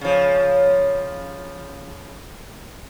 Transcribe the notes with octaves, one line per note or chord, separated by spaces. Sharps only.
C#3 F3